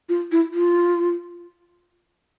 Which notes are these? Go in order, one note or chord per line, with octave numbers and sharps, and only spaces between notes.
F4
E4
F4